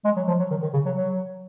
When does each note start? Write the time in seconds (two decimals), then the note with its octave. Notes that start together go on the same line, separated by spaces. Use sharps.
0.05 G#3
0.16 F#3
0.28 F3
0.40 F#3
0.51 D#3
0.63 D#3
0.73 C#3
0.86 F#3
0.96 F#3